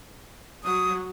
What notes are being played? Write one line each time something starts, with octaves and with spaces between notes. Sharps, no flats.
F#3 D#6